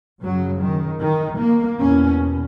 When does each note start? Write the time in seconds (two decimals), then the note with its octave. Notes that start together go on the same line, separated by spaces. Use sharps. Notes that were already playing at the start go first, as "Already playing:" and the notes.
0.22 F#2 C#3 F#3
0.61 D#3
1.01 D#3
1.40 A#3
1.80 E2 B2 C#4